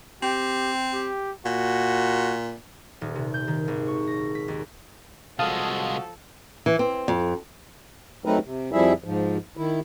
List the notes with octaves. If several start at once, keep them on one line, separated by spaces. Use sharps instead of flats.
C4 G4
G4
A#2 F#4
D#1
C3
G6
D#3
G#1
C#6
A#6
B6
D#2
C2 F3 G#3 F#4 A4 F5 A5 D#6
E3
C4
F2
F#3 A3 C4 D#4 A#4 B4
C3
F2 F3 G3 E4 G#4 E5
G#2 F3
D#3 E4